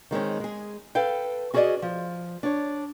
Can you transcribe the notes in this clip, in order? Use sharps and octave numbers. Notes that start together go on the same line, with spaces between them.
D#3 G#3 C4 C#4
G#3 G#4
A4 B4 F5 G5
C#4 F#4 G#4 B4 D5 D#5
F3
D4 C#5